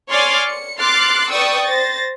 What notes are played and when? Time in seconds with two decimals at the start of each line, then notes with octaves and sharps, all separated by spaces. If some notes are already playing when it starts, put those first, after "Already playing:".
0.11 C#5 D5 G#5 C6 D6 F6
0.48 C#7
0.80 C6 D6 F6 F#6 A6 C7
1.30 B4 D5 G5 C#6 D#6 E6
1.67 C5 A6 A#6